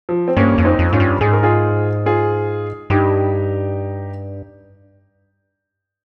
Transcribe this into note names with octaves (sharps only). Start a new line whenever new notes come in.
F3
C4
G2 A#3 C#4
F2 C#4
C4 D#4
F2
G#2 C#4 F4
G2
G#2 G#4
A#4
F4 G#4
F4 G#4
G2 D#4 G4